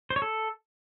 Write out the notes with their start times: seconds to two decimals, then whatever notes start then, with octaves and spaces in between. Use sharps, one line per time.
0.10 C5
0.16 C#5
0.22 A4